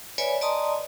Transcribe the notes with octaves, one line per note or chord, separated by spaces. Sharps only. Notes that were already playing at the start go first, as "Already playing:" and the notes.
B4 C#5 D5 E5 G#5 B5
D5 D#5 A5 A#5 C6 D#6